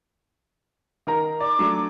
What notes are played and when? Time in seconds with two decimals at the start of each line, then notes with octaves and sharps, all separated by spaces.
1.07 D#3 A#4 A#5
1.40 D5 D6
1.59 F#3 A3 D4